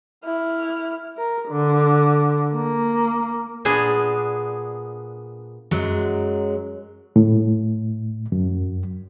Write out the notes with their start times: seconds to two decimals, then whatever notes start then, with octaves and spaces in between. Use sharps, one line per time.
0.24 E4 F6
1.18 A#4
1.50 D3
2.54 A#3
3.65 A#2 B3 D4 G#4
5.71 F#2 F#3 G#3
7.16 A2
8.32 F#2